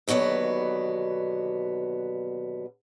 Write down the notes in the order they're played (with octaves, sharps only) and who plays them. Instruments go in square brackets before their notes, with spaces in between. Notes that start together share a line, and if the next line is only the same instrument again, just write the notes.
[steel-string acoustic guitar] D#2 B2 D3 F#3 B3